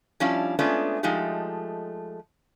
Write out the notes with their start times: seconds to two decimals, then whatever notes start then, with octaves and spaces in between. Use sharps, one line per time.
0.20 F3 G3 C#4 D4 E4 F4
0.59 G#3 A3 B3 C#4 D4 F4
1.03 F3 G#3 A3 D#4 G4